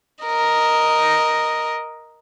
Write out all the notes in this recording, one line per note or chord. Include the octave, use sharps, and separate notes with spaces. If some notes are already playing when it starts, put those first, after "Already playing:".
A#4 D#5